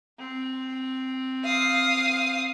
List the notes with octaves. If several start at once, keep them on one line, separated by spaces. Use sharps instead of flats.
C4
F5 D#6